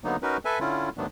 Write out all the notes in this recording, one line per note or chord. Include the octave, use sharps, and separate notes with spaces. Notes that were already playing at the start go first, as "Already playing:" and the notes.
D3 F#3 A#3 B3 D#4
C#4 D#4 F#4 A#4 B4
A4 B4 E5 G#5
D3 C#4 E4 F4
G#2 D#3 F#3 A3 B3 D4